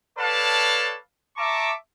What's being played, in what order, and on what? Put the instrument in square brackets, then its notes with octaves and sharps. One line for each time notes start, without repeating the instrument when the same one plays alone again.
[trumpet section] A4 B4 C#5 D5 F5 A5
E5 A5 A#5 C#6 D6